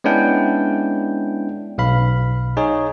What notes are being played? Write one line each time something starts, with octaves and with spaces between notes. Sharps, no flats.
G#3 B3 C#4 D4 E4 G5
B1 F5 B5
D#4 G#4 C#5